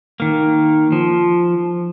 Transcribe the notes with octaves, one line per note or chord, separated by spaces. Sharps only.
D#3 A#3
F3